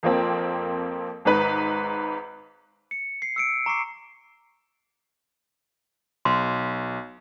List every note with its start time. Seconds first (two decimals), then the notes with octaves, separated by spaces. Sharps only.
0.03 F2 F3 A#3 C4
1.25 G#1 G#2 B4 F#6
2.91 C#7
3.22 C7
3.36 E6 C#7 D7
3.66 A#5 C#6 D6 C7
6.25 B1 C6